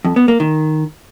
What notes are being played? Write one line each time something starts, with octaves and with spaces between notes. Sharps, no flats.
F2
B3
A#3
D#3